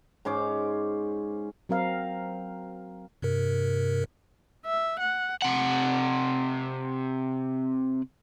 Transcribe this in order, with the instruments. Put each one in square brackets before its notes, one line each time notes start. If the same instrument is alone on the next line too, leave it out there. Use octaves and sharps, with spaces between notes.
[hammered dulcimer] G#2 C#4 C5 D6
[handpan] F#3 C4 A#4 F5
[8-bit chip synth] G2 C3 A#4
[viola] E5
F#5
[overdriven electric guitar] C3 F#5